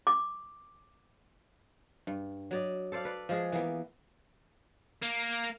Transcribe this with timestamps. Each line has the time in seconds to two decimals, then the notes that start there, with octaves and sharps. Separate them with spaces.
0.07 D6
2.07 G2
2.51 F#3 D5 D#5
2.92 A4 C5 D5 F5
3.05 B4 D5
3.29 F3 G#3 G#4
3.52 E3 A#3 B3
5.02 A#3